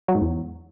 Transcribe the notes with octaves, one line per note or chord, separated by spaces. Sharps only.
F#3
G#2
E2